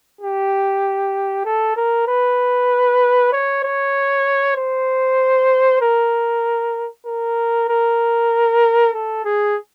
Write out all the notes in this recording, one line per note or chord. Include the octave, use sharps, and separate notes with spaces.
G4
A4
A#4
B4
C#5
C#5
C5
A#4
A#4
A#4
A4
G#4